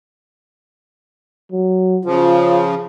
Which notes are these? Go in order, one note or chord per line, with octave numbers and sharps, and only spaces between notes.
F#3
C#3 F3 F4